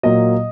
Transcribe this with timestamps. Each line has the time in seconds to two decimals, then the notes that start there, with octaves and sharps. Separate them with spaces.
0.03 A#2 F#3 A#3 D#5